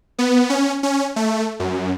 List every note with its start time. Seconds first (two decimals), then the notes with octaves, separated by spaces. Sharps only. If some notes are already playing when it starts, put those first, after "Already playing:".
0.19 B3
0.50 C#4
0.83 C#4
1.16 A3
1.60 F#2